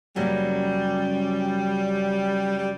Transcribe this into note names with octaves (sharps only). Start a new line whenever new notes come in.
F#2 C#3 F#3 G3 A#3
G3